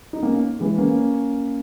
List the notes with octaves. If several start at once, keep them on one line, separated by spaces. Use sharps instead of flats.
D#4
A#3 C#4
E3 G#3
A#3 C#4